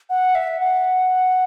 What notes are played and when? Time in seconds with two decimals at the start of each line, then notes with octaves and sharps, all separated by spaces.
0.10 F#5
0.35 E5
0.60 F#5